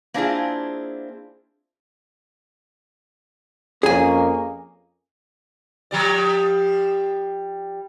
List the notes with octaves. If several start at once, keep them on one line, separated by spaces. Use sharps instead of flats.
A#3 C4 D4 E4 F4 G#4
F2 A#3 C#4 G#4 G#5
F3 G3 D5